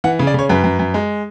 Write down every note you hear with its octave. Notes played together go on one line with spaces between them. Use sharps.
E3 F#5
C#3
D5
C#3 C#5
F#2 B4
F#2
F#2
G#3